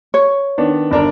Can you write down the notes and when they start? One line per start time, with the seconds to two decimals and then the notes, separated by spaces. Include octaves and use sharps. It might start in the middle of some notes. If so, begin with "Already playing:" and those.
0.14 C#5
0.58 D#3 B3 D4
0.91 G1 D4 A#4